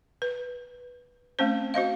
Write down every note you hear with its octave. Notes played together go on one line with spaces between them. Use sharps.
B4
A3 C4 C#4 C5
F#4 C5 D#5 F5